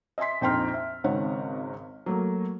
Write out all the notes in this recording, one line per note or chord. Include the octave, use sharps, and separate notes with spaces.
D#5 E5 G#5 C6 B6
A#1 F2 D#4 G5 C6 F6
E5
G#1 G#2 C#3 C4 C#5 F#5
F#3 A3 A#3